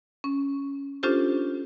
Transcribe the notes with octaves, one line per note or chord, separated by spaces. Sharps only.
C#4
C#4 D4 F4 G4 A4 C5